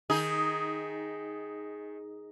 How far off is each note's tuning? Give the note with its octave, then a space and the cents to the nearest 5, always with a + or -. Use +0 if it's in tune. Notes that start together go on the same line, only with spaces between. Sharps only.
D#3 +0 D#4 +20 G#4 +0